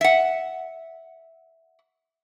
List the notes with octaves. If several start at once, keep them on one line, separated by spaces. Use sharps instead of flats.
E5 F#5